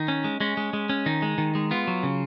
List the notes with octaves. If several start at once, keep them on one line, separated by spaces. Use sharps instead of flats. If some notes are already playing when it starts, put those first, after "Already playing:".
Already playing: D#3 D#4
C#4
G#3
G#3 C#4
G#3
G#3
C#4
D#3 D#4
G#3
D#3
G#3
B3 F4
F#3
C#3